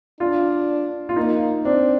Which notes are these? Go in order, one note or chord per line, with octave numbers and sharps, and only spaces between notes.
D4 F4
F4
A#3 D#4
C4 D4